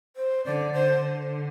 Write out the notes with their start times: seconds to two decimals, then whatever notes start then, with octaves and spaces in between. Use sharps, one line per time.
0.16 C5
0.45 D3 D5
0.73 D3 C5
1.01 D3